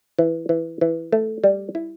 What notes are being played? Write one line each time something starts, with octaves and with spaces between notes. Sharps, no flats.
E3
E3
E3
A3
G3
E4